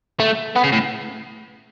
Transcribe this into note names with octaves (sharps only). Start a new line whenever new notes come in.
A3
B3
C#3
A2